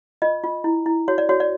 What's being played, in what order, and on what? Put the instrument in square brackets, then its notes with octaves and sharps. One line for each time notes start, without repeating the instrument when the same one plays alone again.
[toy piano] F4 D#5
F4
E4
E4
F#4 C#5
D5
F#4 C#5
D5